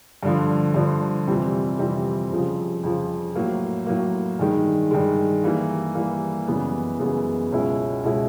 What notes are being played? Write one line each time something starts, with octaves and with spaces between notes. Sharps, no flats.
G2 D3 F3
G2 D3 F3
F2 C3 E3 G3 C4
F2 C3 E3 G3 C4
F2 C#3 F3
F2 C#3 F3
A2 F#3 A#3
A2 F#3 A#3
G2 D#3 G#3
G2 D#3 G#3
E3 G3 A#3
E3 G3 A#3
F#2 C#3 E3 G#3 B3
F#2 C#3 E3 G#3 B3
C#2 B2 G#3 C#4 E4
C#2 B2 G#3 C#4 E4